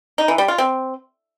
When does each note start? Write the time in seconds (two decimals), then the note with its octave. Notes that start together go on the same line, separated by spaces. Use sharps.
0.18 D#4
0.28 E3
0.38 G3
0.48 F4
0.58 C4